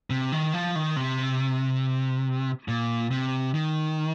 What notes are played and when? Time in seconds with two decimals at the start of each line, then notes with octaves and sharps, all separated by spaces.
0.10 C3
0.32 D#3
0.53 F3
0.75 D#3
0.96 C3
2.68 A#2
3.11 C3
3.54 D#3